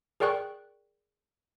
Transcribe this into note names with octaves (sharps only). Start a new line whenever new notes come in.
G#4 A#4 D5 G5 C#6 F#6